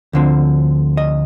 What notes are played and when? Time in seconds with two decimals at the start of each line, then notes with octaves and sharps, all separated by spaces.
0.13 D2 D3 F3 C4
0.97 D#5